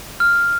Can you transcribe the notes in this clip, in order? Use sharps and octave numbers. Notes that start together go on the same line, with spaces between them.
F6